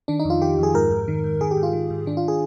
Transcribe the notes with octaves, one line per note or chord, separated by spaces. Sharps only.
D#3 D4
D#4
F2
F4
D#3 G4
F2 G#4
G#2 A#4
G#2
D#3
G#2
D#3 G#4
G4
G#2
F4
D#3
G#2
D#3 D4
F4
G#4